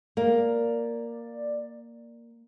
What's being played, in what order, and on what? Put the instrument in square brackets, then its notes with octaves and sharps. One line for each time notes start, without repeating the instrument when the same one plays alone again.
[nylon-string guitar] A#3 [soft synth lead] D5